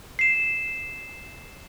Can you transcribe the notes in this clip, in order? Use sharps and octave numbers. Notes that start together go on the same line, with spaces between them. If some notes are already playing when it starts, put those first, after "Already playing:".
C7 E7